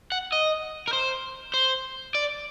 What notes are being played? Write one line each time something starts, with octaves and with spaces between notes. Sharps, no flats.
F#5
D#5
A#4
C5
C5
D5